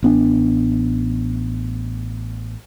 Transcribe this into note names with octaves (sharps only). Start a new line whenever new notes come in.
A1 B3 D4